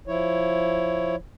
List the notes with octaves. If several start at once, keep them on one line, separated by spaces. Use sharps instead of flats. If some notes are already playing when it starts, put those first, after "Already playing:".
F3 E4 C#5